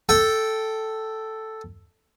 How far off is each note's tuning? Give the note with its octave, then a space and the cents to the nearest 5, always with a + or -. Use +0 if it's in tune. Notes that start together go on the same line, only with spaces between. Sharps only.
A4 +0 G5 -10